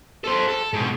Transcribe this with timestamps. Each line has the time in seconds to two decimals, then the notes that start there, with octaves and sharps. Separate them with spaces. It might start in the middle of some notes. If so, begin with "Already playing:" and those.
0.24 A4 C5
0.48 A4
0.73 G#2 B2